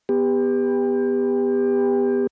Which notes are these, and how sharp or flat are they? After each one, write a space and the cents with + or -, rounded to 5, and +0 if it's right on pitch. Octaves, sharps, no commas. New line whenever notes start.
B3 +0 G4 +30